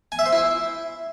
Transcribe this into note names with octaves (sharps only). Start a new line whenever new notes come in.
G#5
E5
C5
E4